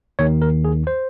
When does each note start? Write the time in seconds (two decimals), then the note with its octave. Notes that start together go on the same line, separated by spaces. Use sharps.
0.19 D#2 D#3 C#5
0.42 A#4
0.65 G#4
0.87 C5